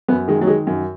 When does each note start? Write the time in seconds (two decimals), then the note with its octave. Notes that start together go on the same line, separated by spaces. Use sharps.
0.08 F#2 B3
0.28 D#3 G#3
0.41 F#3
0.47 D#3 G#3
0.67 F#2